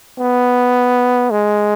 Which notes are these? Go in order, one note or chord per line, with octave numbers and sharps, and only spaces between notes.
B3
G#3